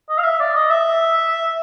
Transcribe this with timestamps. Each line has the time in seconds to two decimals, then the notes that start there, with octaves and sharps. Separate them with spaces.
0.09 D#5
0.18 F5
0.24 E5
0.40 D5
0.55 D#5
0.70 E5